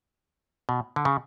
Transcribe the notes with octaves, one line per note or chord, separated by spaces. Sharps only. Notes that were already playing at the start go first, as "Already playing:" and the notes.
B2
D3
C#3